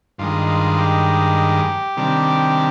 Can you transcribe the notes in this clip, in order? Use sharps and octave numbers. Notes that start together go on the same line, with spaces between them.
G2 D#3 G#3 F4
F4
G4
C3 D#3 G3 D4